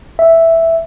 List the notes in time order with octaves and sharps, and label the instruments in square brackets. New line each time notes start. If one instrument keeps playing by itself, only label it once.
[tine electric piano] E5